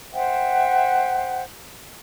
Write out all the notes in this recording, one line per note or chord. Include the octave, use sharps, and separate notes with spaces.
C5 E5 F#5 G5